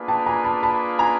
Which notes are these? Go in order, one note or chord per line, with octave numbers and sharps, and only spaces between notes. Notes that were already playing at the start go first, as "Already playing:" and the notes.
Already playing: A#3 D4 F4 G#4 B4
G5 A5
G#5 A#5
A5 B5
A5 B5
G#5 A#5